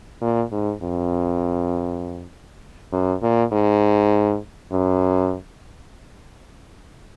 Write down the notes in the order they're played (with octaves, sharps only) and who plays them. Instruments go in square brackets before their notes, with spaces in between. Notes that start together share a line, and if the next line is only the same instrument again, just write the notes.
[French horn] A#2
G#2
F2
F#2
A#2
G#2
F#2